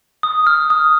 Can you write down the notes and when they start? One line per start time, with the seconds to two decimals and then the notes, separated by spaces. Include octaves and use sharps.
0.23 D#6
0.47 F6
0.70 D#6